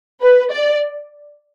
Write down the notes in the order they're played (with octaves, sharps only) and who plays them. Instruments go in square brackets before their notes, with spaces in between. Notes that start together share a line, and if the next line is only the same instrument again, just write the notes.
[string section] B4
D5